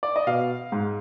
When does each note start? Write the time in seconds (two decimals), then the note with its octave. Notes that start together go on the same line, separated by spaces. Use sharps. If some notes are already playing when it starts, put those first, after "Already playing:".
0.03 D5
0.16 D#5
0.27 B2 F5
0.72 G#2